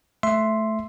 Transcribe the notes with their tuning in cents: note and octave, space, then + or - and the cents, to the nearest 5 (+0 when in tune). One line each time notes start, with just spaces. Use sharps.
A3 -10 E5 +10 C6 +0